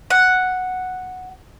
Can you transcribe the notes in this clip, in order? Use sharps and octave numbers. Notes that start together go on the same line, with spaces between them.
F#5